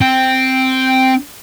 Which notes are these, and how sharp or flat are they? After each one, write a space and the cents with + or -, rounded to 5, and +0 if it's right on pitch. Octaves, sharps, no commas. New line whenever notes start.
C4 +0 G5 +0